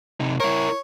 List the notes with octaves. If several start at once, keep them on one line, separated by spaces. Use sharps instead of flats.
C3 D#4
E4 A#4 C#5